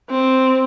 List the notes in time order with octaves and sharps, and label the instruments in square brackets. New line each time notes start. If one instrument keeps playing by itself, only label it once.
[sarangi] C4